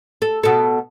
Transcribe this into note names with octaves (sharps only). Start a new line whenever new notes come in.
A4
B2 A4